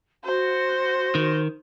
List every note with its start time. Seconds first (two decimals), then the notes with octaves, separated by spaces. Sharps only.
0.24 F#4 C5
1.15 D#3